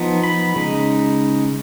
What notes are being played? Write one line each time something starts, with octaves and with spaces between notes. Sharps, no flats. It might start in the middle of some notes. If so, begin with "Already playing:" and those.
Already playing: F3 B3 D#4
B5
C#3 G#3 D#4